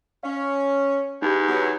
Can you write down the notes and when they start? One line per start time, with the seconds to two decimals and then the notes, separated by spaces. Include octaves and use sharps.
0.23 C#4 F5
1.22 E2 D#4 G4
1.47 F#3 B3